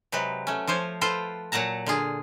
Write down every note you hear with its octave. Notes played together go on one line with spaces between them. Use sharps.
C3 F#3 G#3 B4
A3 C#4
F3 F4 C5 C#5
F4 A4 B4 C5 G5
A#2 F#3 F#5 A5 A#5
D3 F4 G#4